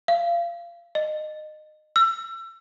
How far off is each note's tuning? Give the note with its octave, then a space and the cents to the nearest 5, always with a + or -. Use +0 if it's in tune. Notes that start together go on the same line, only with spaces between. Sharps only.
F5 -25
D#5 -25
E6 +30